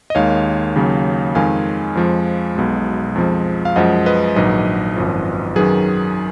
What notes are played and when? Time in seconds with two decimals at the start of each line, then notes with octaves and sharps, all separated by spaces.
0.10 D#5
0.15 D#2 D#3 G#3 C#5 F5
0.76 D#2 C#3 F#3
1.35 F2 D#3 G#3 F5 G#5
1.95 F2 F3 G#3
2.55 B1 B2 G#3
3.15 F2 F3 G#3
3.65 F5
3.76 F#2 F3 G#3 D#5 F#5
4.06 B4 D#5
4.36 A#1 G#2 D#3 F#3 B4 D#5
4.96 G#1 F#2 F3
5.56 F#2 D#3 F#3 G#4 B4